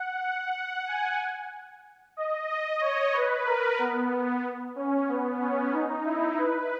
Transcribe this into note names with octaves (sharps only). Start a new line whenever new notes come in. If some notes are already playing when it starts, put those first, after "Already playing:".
Already playing: F#5
F#5
G#5
D#5
D#5
C#5
B4
A#4
B3
C#4
B3
C#4
D#4
E4
B4